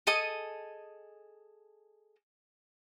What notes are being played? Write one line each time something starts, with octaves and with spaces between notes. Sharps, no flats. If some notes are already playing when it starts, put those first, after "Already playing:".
G#4 A4 D#5 D#6